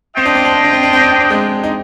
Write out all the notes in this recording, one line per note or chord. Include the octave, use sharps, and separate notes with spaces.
C4 F4 C5 D#5 G5
D4
C4
D4
C4
D4
C4
D4
C4
D4
C4
D4
G#3 C4
D#4